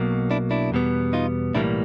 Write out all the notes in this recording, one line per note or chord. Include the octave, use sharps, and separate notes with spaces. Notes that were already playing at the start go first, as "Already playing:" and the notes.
Already playing: B1 B2 F#3 A#3
D4 E4
D4 E4
E2 B2 G3 B3
D#4 F4
B1 A2 E3 G3 A#3 D4 E4